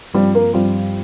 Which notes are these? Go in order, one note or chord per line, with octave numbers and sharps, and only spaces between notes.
G2 F3 G3 C4 F4
A#3
G2 F3 G3 C4 F4